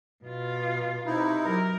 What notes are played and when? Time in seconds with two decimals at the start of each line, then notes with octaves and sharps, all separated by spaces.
0.24 B2 F4
1.06 C3 D#4 E4
1.42 F#3 A#4